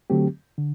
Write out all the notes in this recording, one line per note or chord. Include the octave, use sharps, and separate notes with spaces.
D3 F#3 A3 C4 G4
D3